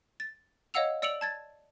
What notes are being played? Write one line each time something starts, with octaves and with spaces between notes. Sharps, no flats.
A6
C#5 D#5 F5 F#5 E6 F7
D5 E6 C#7 D7 F7 F#7
A5 G#6 A6